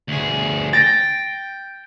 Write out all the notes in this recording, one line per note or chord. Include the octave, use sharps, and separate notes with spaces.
D2 G#4
G5 A6 A#6